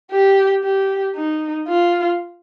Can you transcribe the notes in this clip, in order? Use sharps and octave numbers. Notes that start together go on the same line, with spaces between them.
G4
G4
D#4
F4